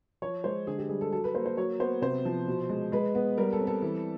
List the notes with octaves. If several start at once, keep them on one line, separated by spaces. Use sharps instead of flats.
F3 C#5
G#3 C5
D3 G#4
G4
G3 G#4
A4
F#3 A4
B4
A#3 C5
C5
F#3 C#5
B3 C5
C3 C5
F3
B2
G#3
G#3 B4
B3
G3 A#4
A4
C4
A4
E3